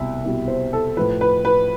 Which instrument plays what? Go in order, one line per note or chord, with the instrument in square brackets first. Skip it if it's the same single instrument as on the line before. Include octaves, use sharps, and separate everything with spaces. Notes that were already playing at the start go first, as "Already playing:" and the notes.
Already playing: [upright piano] C2 B2 G3 E5
C2 B2 G3
C5
A4
A2 F3 B4
B4
B4